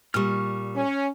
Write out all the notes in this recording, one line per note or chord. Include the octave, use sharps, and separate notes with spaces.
A#2 G3 C#6 F6
C#4